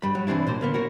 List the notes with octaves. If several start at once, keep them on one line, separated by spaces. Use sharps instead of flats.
G2 G3 B5
F#3
C2 E3 C4 D4 E4
B1 A#2 C5
D3 A#3 B3
F#4 A#4 C#5